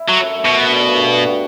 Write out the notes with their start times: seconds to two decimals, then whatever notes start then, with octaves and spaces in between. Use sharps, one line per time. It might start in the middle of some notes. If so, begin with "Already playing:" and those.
Already playing: E4
0.08 F#3 A4
0.22 F#2
0.38 A3
0.45 B2
0.53 F#2
0.66 D3
0.82 G2
0.97 G2
1.11 F#4
1.26 F#4